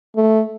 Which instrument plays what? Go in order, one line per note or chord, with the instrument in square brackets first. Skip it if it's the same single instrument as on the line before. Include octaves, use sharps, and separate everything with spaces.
[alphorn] A3